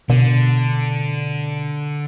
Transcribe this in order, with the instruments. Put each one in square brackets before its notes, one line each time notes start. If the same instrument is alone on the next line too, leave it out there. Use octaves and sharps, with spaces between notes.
[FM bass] B2 [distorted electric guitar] D3